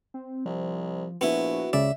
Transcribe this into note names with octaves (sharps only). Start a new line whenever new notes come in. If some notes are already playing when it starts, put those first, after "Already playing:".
C4
C2 F3
A#1 B3 E4 F#4
C#2 C#3 D5 E5